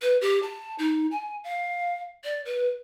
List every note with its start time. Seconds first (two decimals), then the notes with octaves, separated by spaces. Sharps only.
0.02 B4
0.21 G4
0.43 A5
0.79 D#4
1.11 G#5
1.44 F5
2.24 D5
2.45 B4